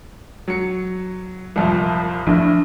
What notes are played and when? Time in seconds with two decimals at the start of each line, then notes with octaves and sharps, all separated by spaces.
0.48 F#3 C#7
1.56 C2 F2 A#2
2.27 A#1 A2 F3 D4